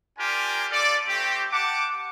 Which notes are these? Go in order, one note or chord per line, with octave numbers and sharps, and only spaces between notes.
D4 F4 G4 A#4 G#5
F4 A4 D5
A3 C4 G4
G4 F#5 A5 D6